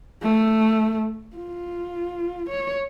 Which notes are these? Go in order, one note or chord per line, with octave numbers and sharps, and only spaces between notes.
A3
F4
C#5